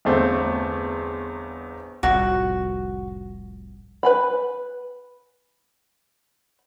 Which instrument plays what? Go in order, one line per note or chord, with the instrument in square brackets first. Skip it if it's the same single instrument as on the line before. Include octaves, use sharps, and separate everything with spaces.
[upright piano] G1 E2 A3 C4
[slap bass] F1 C2 A2 [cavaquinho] F#4
[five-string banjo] B4 G#5 B5